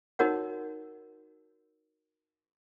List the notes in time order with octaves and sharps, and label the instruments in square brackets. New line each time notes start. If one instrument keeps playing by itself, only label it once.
[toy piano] D#4 F#4 A#4 C#5 F#5